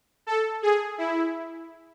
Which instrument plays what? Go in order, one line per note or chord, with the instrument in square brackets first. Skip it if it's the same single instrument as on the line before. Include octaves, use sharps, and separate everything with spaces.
[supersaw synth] A4
G#4
E4